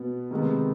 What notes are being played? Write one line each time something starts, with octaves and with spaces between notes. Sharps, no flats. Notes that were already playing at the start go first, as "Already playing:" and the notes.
Already playing: B2 B3
C3 D#3 G#3 B3